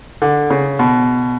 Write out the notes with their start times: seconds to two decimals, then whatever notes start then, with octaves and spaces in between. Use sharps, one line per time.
0.22 D3
0.50 C#3
0.79 B2